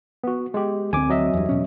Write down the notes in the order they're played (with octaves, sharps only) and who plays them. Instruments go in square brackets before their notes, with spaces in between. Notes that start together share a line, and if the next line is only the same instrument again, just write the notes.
[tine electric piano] B3 F#4
G#3 G4
[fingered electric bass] D2 C4 [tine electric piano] G#5 D6
[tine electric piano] F#3 D#5 E5
[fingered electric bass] E2 G2
E2 B2 C#4